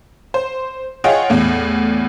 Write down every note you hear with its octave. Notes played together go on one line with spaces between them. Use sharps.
C5
F4 G#4 C#5 D#5 F#5 G5
E2 A2